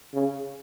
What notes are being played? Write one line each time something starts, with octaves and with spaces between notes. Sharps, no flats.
C#3